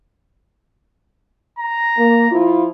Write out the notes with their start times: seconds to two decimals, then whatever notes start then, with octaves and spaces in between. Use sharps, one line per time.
1.59 A#5
1.98 A#3
2.31 F3 E4 F4